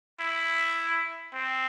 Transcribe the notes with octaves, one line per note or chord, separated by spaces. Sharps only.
E4
C4